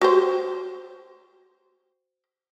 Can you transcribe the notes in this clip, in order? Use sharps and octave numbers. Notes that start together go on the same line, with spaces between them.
F#4 G4 C5